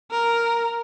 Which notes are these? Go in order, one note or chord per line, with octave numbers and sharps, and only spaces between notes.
A#4